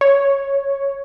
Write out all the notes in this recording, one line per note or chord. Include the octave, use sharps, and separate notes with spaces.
C#5